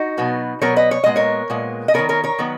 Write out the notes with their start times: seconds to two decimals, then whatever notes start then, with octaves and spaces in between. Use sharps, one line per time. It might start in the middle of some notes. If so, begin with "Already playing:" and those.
Already playing: D#4 F#4
0.17 B2 F#3 B3
0.62 B2 F#3 B3 A#4 C#5
0.76 B4 D#5
0.91 C#5
1.04 A#2 G#3 B3 D#5
1.16 A#4 C#5
1.50 A#2 G#3 B3
1.88 D#5
1.94 D#3 F#3 B3 A#4 C#5
2.09 A#4 C#5
2.24 A#4 C#5
2.39 D#3 F#3 B3